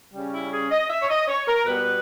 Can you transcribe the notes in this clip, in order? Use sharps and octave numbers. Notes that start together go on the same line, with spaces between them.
C#3 G3 C#4
E4
G#4
D#5
E5
C#5
D#5
C#5
A#4
B2 G3 B3 B4